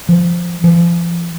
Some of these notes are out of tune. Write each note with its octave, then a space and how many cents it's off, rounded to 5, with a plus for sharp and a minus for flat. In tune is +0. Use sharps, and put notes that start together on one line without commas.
F3 -10
F3 -35